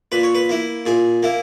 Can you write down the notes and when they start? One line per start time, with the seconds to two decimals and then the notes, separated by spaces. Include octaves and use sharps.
0.12 A#2 B4
0.23 C#5
0.35 B4
0.49 A#3 E4
0.86 A#2 G#4
1.23 A#3 E4